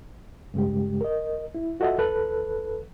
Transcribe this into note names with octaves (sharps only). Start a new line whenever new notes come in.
G2 C#3 G#3 G4
A#4 D#5
E4
F4 F#4 A4 D#5 E5 F#5
D#2 E3 A4 B4 F#6